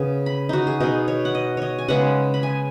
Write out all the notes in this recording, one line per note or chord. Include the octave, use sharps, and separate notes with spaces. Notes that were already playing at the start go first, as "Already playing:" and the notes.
Already playing: C#3 B3 G#5
B5
D#4 F#4
G#4
B2 B3 D#4
C#5
F#5
D#5
C#5 D#5
G#5
C#3 G#3 B3 F#5
B5
G#5